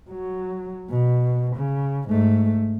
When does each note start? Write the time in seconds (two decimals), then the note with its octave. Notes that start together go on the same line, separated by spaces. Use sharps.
0.10 F#3
0.90 B2
1.56 C#3
2.09 G#2 A3